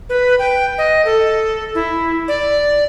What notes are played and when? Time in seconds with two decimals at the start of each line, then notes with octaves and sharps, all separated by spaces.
0.09 B4
0.39 G5
0.78 D#5
1.05 A4
1.75 E4
2.28 D5